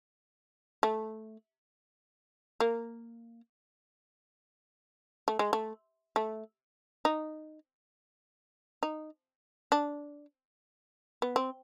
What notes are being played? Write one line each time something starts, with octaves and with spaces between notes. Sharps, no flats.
A3
A#3
A3
G#3
A3
A3
D#4
D#4
D4
B3
C4